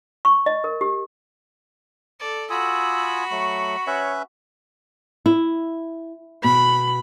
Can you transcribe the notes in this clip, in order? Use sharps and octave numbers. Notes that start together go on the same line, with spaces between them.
C#6
D#5
A#4
G4
A4 D5
F4 F#4 G#5 B5 D#6 E6
F#3 A3 C#6
C#4 B4 C#5 E5
E4
B2 B5